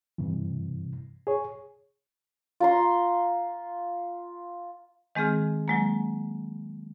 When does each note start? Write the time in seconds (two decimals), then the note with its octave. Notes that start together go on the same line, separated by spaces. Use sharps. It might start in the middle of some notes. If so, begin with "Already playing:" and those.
0.18 G2 C3 E3
1.27 G#4 C#5
2.60 F4 A#5 C6
5.15 D#3 G#3 C4 G#4 F6
5.68 F#3 G#3 A#3